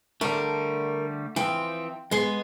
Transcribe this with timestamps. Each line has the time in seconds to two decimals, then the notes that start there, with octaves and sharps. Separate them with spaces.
0.21 D3 G3 A3 A#4
1.36 E3 F3 C4 G5
2.11 G#3 B3 G#4 C6